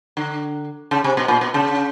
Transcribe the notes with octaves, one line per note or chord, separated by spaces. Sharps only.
D3
C#3
C3
B2
A#2
B2
C#3